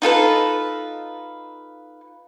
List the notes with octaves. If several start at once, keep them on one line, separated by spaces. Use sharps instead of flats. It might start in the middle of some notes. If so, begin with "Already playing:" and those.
D#4 F4 A4 B4